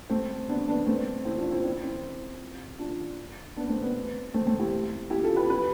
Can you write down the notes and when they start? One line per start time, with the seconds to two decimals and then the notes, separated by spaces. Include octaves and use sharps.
0.10 A3 C4
0.48 B3 D4
0.68 B3 D4
0.87 A3 C4
1.25 C4 E4
1.38 D4 F4
1.51 C4 E4
1.64 C4 E4
1.83 C4 E4
2.79 D4 F4
3.57 B3 D4
3.69 A3 C4
3.82 B3
4.34 A3 C4
4.47 A3 C4
4.59 E4 G4
5.10 E4 G4
5.23 F4 A4
5.37 G4 B4
5.50 G4 B4